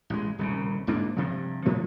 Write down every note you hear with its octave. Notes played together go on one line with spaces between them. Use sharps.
A1 G#3
D#1 C2 C#3
D1 G#2 A#3 D4
G2 C3 F3
A2 F3 A3